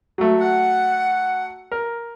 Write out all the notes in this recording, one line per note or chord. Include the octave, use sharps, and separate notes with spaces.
F#3 A3
F#5
A#4